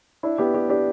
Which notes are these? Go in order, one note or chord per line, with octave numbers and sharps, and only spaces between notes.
D4 E4
B3 G4
D4 G4
D4 G4